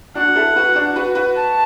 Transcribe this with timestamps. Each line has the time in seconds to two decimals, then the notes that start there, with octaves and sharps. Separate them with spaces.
0.15 D4 F#4 F#5
0.36 E4 A4
0.56 F#4 B4
0.75 D4 F#4
0.96 F#4 B4
1.15 F#4 B4
1.35 A5